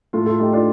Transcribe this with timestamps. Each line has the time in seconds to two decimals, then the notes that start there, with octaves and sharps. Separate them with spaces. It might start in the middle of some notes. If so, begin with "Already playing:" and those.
0.13 A2 F4 A4
0.26 F4 A4
0.39 A3 D#4 G4
0.53 D4 F4